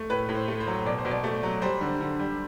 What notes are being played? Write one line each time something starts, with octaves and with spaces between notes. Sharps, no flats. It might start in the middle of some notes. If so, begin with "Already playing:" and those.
Already playing: A3
A2 B4
A2
C5
A3
C5
F#3
B2 D5
C5
B2
D5
A3
F#3
G3 C5
D3
D3
G3